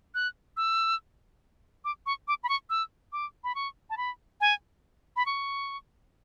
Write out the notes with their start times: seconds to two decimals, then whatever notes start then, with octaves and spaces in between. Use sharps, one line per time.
0.15 F#6
0.57 E6
1.85 D6
2.06 C#6
2.28 D6
2.43 B5
2.49 C#6
2.70 E6
3.13 D6
3.44 B5
3.55 C#6
3.90 A5
3.97 B5
4.41 G#5
5.16 B5
5.26 C#6